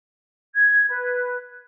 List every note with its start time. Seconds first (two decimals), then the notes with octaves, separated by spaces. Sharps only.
0.55 G#6
0.88 B4